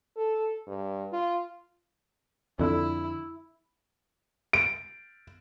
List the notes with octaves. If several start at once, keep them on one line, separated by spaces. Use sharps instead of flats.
A4
G2
F4
F2 D3 E4
D7